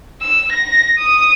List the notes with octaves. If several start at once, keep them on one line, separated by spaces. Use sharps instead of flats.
E6
A#6
D#6